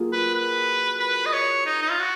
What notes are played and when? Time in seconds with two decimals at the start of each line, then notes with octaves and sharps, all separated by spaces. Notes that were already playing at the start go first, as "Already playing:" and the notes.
Already playing: F#3 A#3 F4 G#4
0.13 B4
0.35 B4
1.00 B4
1.26 D#5
1.33 C#5
1.66 D#4
1.82 D#4
1.91 F4
1.99 F#4